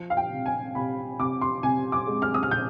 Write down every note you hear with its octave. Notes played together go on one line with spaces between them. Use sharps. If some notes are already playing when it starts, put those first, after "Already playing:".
Already playing: F3
F5
G5
C3
G#5
C3 B5
C3 D6
C6
C3 G#5
D6
G#3
F6
D#6
F6
C3 G6